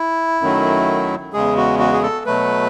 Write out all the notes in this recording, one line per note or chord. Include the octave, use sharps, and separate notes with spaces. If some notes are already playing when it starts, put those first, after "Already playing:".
Already playing: E4
F#2 D#3 F#3 A3
E2 C#3 G#3 G#4
F#4
F#4
G#4
A4
B2 F#3 A3 B4